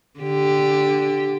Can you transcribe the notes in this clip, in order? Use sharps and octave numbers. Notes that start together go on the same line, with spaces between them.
D3 G4